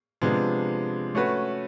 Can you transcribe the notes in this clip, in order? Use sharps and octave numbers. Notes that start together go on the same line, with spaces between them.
C3 F3 G#3 B3 D4
A3 C#4 F#4 B4